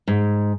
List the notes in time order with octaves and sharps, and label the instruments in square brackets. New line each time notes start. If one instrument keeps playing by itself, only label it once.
[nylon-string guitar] G#2